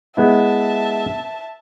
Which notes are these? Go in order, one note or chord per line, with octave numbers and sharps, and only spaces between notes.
G#3 B3 E4 E5 A5